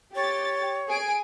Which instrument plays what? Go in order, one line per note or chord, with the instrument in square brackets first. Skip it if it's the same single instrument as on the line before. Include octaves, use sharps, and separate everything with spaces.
[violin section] G4 A6 [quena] C#5
[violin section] G#4 G#5 D7